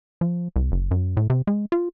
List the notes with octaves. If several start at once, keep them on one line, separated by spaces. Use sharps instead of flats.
F3
C2
F#1
F#2
A2
C3
G#3
F4